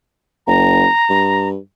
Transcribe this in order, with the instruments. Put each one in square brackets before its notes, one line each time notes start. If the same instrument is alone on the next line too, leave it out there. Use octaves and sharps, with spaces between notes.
[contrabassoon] F#1 [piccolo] A#5
[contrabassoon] G2